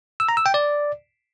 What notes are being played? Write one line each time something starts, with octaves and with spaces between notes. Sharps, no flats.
E6
A#5
E6
G5
D5